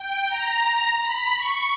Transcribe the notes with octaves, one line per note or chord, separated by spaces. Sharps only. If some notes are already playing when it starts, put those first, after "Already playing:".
Already playing: G5
A#5
B5
C#6